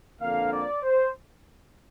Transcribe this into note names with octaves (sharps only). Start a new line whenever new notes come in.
F2 D3 A#3 F5
D5
C5